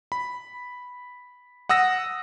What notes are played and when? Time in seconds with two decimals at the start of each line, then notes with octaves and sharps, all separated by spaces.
0.12 B5
1.69 F#5 D#6 E6 A#6